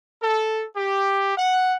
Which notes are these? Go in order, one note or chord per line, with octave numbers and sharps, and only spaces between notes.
A4
G4
F#5